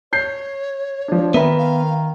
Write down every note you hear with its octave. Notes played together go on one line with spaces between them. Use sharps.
C#5 G6 C7
F3 D4
D#3 B3 A#4 B4 E5
F5